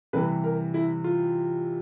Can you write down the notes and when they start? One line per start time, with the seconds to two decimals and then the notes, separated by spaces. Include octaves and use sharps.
0.13 C3 E3 G3 B4
0.44 A#4
0.74 E4
1.04 F4